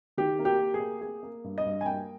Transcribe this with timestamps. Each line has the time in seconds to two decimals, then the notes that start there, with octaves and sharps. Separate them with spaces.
0.17 D#3 G4
0.39 A#3
0.45 G4
0.59 A#3
0.74 G#4
0.80 A#3
1.01 A#3 G#4
1.23 A#3
1.44 G2
1.58 D#5
1.65 G2
1.81 G#5
1.85 A#3 G5